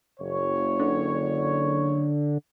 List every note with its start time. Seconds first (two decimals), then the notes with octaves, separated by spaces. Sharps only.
0.20 F#1 C#5
0.80 D3